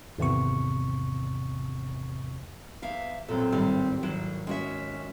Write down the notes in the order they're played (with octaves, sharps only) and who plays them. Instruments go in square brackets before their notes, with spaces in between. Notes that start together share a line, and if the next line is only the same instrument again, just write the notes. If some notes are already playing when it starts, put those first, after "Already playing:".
[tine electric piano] G#1 E2 C3 C#6
[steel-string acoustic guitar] E2 E5 F5
[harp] B1 F#2 A#2 [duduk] C4 [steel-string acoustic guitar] A4
[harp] G#1 A2 [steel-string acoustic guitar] G3
[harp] G#1 [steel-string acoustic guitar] F#3
[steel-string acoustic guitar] G#3 F#4 E5 [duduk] C#4